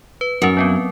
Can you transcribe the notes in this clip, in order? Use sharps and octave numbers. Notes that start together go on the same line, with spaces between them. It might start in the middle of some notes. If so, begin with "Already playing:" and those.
B4
F#2 C#4 A#4
F#3 B3 C4